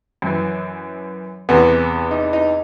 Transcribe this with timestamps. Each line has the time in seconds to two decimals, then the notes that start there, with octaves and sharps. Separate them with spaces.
0.22 F#2 E3
1.49 E2 C3 E3 B3
2.11 D#4
2.33 D#4